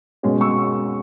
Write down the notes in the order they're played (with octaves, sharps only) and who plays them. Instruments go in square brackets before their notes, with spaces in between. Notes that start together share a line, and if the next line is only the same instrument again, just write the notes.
[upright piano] B2 G#3 C#4
C#6 E6